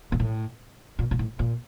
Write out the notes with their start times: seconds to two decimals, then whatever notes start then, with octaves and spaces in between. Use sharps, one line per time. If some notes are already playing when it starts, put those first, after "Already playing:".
0.12 A#2
0.20 A2
0.99 A#2
1.11 A#2
1.19 A2
1.39 A#2